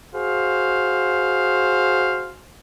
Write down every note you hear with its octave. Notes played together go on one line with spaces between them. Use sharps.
F#4 G#4 C5 F5